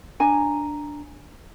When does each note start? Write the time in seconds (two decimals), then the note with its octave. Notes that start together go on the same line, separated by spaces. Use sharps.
0.20 D4 G#5 A#5